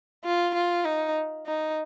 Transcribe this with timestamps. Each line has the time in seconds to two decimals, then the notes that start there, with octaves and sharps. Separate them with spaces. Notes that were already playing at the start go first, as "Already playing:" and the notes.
0.25 F4
0.55 F4
0.85 D#4
1.46 D#4